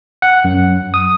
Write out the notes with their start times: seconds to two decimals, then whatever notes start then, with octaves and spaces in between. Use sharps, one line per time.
0.22 F#5
0.44 F#2
0.94 D#6